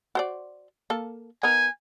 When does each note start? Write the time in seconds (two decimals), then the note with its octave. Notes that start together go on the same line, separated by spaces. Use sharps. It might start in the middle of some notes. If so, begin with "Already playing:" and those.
0.15 F#4 C5 D5
0.90 A#3 A4
1.43 B3 D#4 A#4 G#5